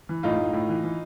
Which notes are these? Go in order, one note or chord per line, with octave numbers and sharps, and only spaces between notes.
E3
A2 D#4 F4
A2
A2
E3
E3